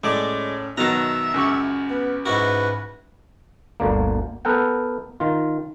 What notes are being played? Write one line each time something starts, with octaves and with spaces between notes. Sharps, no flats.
A2 G#3 C#4 D5
B2 D#3 F#3 E5 A5 A#5
C#2 F#2 C#6
B3
G#2 E4 F#4 B4
G1 D2 D3 A#3
B3 A4 A#4 F#5 G5
D#3 F4